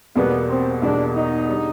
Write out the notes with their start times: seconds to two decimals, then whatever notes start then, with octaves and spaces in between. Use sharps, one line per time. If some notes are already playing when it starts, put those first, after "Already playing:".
0.15 E2 B2 G3 A#3 B3
0.49 C4
0.82 E2 B2 G3 A#3 D4
1.15 D#4
1.49 D3 G3